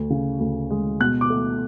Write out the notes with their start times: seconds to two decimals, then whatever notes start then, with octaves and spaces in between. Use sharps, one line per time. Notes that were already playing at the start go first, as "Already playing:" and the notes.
Already playing: D2
0.10 C#3
0.40 D2
0.70 G#3
1.00 B2 F#6
1.21 D6
1.30 A3